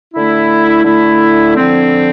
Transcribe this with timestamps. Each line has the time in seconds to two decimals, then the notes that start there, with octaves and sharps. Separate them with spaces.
0.14 D3 A3 E4
0.85 D3 A3 E4
1.56 D3 F3 C4